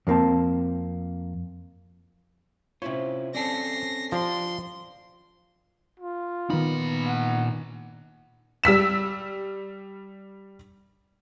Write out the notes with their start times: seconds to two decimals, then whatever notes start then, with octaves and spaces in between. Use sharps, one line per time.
0.07 F2 C#3 A#3 C4 A5
2.82 C3 C#4 E4 F4 C5 C#5
3.34 C4 C#4 A4 D5 A#6 C7
4.12 F3 D4 G4 C6
6.00 F4
6.50 A#2 D#3 B3 D#4 B5
7.06 F#5
8.64 G3 E6 B6 E7